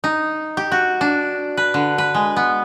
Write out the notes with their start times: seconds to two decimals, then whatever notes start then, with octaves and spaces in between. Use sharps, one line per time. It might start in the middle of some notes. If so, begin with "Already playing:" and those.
0.04 D#4
0.57 G4
0.72 F#4
1.01 D4
1.57 B4
1.74 D3
1.98 B4
2.15 G#3
2.36 B3